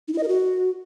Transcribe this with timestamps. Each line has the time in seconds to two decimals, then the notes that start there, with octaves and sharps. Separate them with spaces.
0.08 D#4
0.13 E4
0.18 D#5
0.23 A#4
0.28 F#4